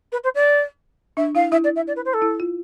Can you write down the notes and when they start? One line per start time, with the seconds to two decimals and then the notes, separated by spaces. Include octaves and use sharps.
0.12 B4
0.24 C5
0.35 D5
1.17 D4 E5
1.35 E4 F5
1.52 E4 E5
1.64 D5
1.76 E5
1.88 D5
1.96 B4
2.05 C5
2.14 A4
2.22 E4
2.40 F4